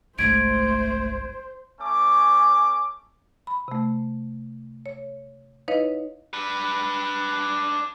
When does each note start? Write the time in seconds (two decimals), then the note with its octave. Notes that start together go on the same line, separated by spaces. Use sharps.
0.19 G1 C2 G#3 A3 C5 G#6 D7
1.81 A3 C#4 D6
3.47 B5
3.68 C3 A3
4.86 C#5
5.68 D#4 E4 B4 C#5 D#5 F5
6.33 D4 B4